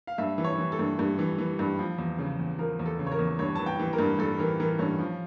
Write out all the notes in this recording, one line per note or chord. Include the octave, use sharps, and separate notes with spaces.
F5
G2 E5
E3
C#5
E3
A4
G2
G2
E3
E3
G2
F3
E2
C#3
E2
F3 A#4
E2
A4
C#3
C#5
A#4
E2
G2 C#5
E3 A5
G5
E3
A#4
G2
G2 A4
E3 A#4
E3 A#4
G2 C#4
F3